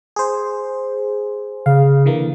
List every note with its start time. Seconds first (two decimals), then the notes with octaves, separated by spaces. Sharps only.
0.16 G#4 C5
1.66 C#3 F5
2.06 D3 E3 A#3